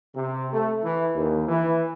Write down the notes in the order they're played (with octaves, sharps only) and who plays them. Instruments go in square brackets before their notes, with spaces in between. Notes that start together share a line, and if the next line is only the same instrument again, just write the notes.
[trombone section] C3
A3
E3
D#2
E3